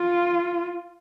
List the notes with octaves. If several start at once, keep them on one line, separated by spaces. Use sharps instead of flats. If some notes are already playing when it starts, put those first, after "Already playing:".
Already playing: F4